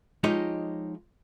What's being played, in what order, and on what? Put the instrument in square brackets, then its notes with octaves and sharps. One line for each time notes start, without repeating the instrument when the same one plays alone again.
[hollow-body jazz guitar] F3 G#3 D#4 G4 C#5